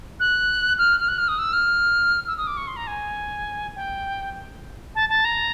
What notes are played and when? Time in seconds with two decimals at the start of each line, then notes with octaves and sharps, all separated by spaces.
0.20 F#6
0.78 F6
1.00 F6
1.09 F#6
1.18 F6
1.28 D#6
1.39 E6
1.53 F6
2.27 E6
2.37 D#6
2.47 D6
2.57 C#6
2.67 C6
2.77 A#5
2.87 G#5
3.76 G5
4.95 A5
5.09 A5
5.25 A#5